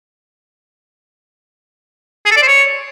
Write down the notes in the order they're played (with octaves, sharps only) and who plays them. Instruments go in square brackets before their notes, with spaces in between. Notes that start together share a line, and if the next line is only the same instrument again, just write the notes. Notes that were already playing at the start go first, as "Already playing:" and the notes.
[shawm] G#4
A4
D5
C5
C#5